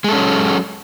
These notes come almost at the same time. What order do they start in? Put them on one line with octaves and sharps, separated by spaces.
G#3 A4 C#4 F#3